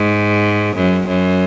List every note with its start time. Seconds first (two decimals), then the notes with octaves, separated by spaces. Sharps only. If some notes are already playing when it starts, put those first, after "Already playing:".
Already playing: G#2
0.76 F#2
1.07 F#2